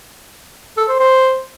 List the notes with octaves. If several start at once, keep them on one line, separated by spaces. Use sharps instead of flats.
A4
C5
C5